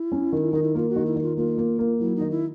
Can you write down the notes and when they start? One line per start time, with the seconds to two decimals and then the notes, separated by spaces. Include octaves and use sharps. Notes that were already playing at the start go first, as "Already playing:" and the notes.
Already playing: E4
0.12 C#4
0.32 D#3
0.53 D#3 D#4
0.63 E4
0.75 A#3 F4
0.90 F#4
0.96 D#3
1.06 E4
1.16 D#3
1.22 F4
1.37 A#3 F4
1.58 A#3
1.79 A#3
1.99 F#3 E4
2.16 D#3 D#4
2.31 E4